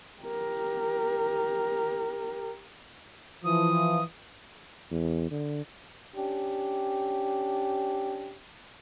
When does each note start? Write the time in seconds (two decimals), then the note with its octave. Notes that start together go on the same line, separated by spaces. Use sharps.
0.23 G4 A#4
3.45 E3 F3 D#6
4.91 E2
5.31 D3
6.16 C#4 D4 G4